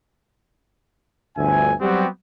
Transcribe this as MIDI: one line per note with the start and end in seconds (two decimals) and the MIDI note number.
1.37 1.72 31
1.37 1.72 38
1.37 1.72 76
1.37 1.72 80
1.81 2.07 54
1.81 2.07 55
1.81 2.07 59
1.81 2.07 60
1.81 2.07 66
1.81 2.07 67